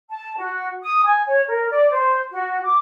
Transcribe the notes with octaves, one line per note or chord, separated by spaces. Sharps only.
A5
F#4
D#6
G#5
C#5
A#4
D5
C5
F#4
D6